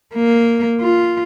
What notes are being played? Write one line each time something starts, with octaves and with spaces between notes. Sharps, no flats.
A#3
F4